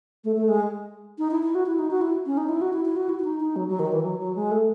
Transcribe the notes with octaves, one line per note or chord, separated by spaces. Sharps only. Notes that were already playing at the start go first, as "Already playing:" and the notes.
A3
A3
G#3
D#4
E4
E4
F#4
E4
D#4
F#4
E4
C#4
D#4
E4
F#4
E4
E4
F#4
E4
E4
D#4
D#4
F#3
F#3
D#3
E3
F#3
F#3
G#3
A3